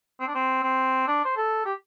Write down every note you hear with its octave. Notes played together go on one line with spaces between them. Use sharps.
C4
D4
C4
C4
D4
C5
A4
G4